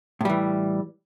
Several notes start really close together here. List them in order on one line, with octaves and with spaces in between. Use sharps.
A2 G3 E3